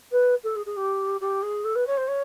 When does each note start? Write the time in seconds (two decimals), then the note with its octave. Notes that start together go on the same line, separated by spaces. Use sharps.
0.11 B4
0.43 A4
0.55 G#4
0.66 G#4
0.76 G4
1.21 G4
1.42 G#4
1.64 A4
1.75 B4
1.86 C#5
1.97 C5
2.07 C#5